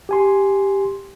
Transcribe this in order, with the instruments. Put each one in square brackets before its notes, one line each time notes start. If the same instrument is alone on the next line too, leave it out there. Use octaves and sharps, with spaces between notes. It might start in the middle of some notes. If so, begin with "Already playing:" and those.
[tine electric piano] G4 G#5 C6